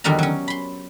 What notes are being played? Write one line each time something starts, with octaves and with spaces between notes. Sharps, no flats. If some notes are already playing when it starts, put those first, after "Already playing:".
E2 D3 D#3 G3 F#4 A#5
F#3 C#4
B5 C6